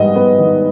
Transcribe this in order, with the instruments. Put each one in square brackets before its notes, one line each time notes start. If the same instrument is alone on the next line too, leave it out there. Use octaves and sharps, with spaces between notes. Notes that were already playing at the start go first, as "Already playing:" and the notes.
Already playing: [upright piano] G#2 G3 B3 D#5
B3
D#3